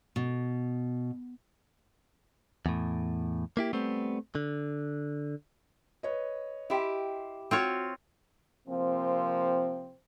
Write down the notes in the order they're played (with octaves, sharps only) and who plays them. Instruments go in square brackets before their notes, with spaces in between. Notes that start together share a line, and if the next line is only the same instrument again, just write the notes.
[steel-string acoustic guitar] B2
[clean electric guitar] E2 A2
A#3 E4 G4
G3 A3 B3 C4
D3
[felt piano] B4 C#5 D#5
[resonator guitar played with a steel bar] E4 G4 [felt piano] D#5 B5 C6
[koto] C4 F4 C#5 [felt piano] F#4
[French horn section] C3 F3 A#3 C4